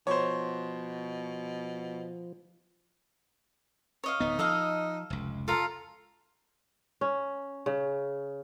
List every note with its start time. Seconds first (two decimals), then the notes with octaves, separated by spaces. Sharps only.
0.07 B2 F3 C5 C#5
4.04 C#5 D#5 F5
4.20 D1 B3 D#4
4.39 F3 A4 D#5 F5
5.10 F1 C#2
5.48 F4 A4 F5 A#5
7.01 C#4
7.66 C#3